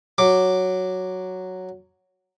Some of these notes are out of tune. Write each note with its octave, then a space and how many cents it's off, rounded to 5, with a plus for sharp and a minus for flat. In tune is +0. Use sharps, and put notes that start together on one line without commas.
F#3 +0 D6 +0